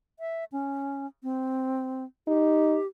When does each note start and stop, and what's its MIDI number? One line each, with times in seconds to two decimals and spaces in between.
0.19 0.44 76
0.52 1.07 61
1.23 2.04 60
2.28 2.77 63
2.28 2.87 67